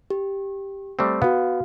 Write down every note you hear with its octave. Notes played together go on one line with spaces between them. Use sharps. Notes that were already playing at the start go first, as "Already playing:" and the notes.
G4
G3 A3 C4
B3 F#4 F5